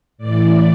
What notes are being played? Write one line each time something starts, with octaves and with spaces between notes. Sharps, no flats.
A2 E3 D5